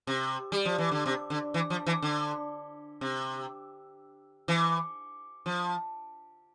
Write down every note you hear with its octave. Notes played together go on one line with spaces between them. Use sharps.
C3
G3
F3
E3
D3
C3
D3
E3
F3
E3
D3
C3
E3
F3